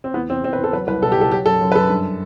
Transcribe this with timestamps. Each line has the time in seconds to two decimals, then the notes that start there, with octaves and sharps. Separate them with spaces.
0.04 C4
0.14 E2 B3
0.29 E2 C4
0.44 E2 C4
0.53 B4
0.58 E2
0.64 A4
0.73 F#3 B4
0.87 C2 B4
1.02 B2 A4
1.12 G4
1.16 C2 A4
1.31 F#3 G4
1.46 F#2 A4
1.61 F#2
1.72 B4
1.75 F#2 A4
1.89 G2